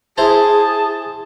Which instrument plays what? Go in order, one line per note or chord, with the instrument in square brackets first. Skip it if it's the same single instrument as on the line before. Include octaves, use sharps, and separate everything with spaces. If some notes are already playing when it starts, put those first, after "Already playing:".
[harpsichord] E4 C5 A#5 [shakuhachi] G#4 [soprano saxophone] A5